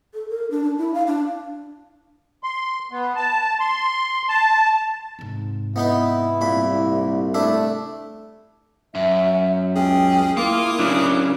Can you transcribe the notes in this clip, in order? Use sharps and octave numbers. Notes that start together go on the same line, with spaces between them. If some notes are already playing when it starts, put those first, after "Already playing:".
A4
A#4
D4
D4
E4
F5
D4
C6
B3
A5
C6
A5
G#2 C3
B3 D#4 E4 B4
C2 A#2 B5
A3 D4 E4 E5
F#2 E5
C#2 C#4 G#4 G5
A#3 E4 F4 A#4 D6 D#6
C#3 F#3 D4